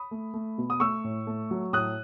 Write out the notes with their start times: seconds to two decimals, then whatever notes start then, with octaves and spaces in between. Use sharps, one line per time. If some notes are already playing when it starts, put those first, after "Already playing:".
Already playing: B5 D#6
0.11 A3
0.34 A3
0.58 B2
0.70 D#6
0.80 A3 C#6 E6
1.04 A2
1.27 A3
1.51 F#3
1.73 A2 D#6 F#6